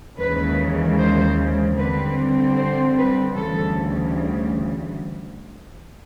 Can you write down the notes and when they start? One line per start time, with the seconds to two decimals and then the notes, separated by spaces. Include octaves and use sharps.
0.18 D#2 C#3 E3 G#3 B4
0.98 C5
1.77 D3 G3 C4 B4
2.57 C5
2.97 B4
3.36 D2 C#3 E3 G3 A4